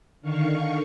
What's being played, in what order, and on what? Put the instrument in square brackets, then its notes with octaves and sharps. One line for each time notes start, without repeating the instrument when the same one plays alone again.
[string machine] D3 D#3 F5 C#6